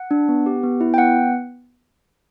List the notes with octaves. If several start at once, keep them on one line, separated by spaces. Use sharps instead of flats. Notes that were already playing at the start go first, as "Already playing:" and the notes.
Already playing: F#5
D4
B3
G4
B3
E4
G5
B3 F#5